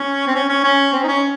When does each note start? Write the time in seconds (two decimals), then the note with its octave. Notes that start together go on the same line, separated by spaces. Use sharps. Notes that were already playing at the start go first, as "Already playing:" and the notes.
Already playing: C#4
0.27 C4
0.35 C#4
0.49 C#4
0.64 C#4
0.93 C4
1.03 D#4
1.07 C#4